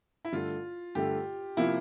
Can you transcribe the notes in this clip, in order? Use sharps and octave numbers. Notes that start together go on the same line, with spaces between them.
E4
G2 D3 A3 F4
G2 D3 A3 G4
C3 F3 A#3 E4 F4